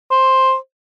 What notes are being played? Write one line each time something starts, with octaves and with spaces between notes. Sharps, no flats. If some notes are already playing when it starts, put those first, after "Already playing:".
C5